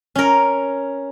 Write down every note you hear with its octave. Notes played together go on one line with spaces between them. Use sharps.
C#4 A#4